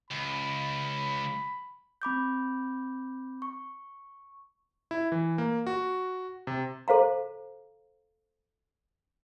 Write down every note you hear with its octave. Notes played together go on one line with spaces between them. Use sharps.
C#2 B5
C4 B5 D6 G6
C#6
E4
E3
A#3
F#4
C3
A4 C5 F5 A#5